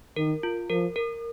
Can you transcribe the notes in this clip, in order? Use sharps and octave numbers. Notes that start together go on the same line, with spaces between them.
D#3 A#4
F4
F3 A#4
A#4